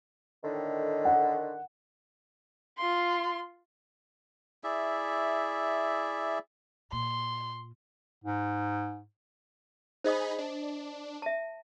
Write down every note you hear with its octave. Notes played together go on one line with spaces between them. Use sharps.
A2 D3 D#3
F#5
F4 C6
E4 G#4 D5 E5
A#2 C6
G#2
D#4 G#4 C5 D#5 B5 D#6
D4
E5 A5